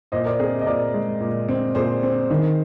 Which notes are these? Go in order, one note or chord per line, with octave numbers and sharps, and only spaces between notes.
A#2 C5 D#5
A#4 D5
C4 G#4 C5
D#5
A#2 A#4 D5
G#3
A#2
C4
A#2 G#4 C5
C4
D#3